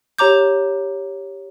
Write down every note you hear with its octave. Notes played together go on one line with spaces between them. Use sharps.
G4 C#5 A#5 D6 G6